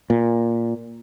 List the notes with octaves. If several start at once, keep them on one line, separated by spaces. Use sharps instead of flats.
A#2